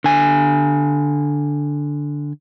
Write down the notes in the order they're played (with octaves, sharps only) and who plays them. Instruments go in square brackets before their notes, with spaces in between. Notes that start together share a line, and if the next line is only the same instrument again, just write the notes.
[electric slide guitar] D3 G#5